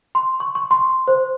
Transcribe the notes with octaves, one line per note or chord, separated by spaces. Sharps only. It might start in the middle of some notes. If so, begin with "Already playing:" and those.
C6
C#6
C#6
C6
C5